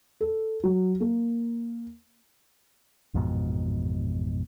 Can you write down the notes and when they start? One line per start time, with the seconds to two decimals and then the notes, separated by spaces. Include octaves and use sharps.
0.21 A4
0.63 F#3
1.00 A#3
3.14 A1 F2 G#2 B2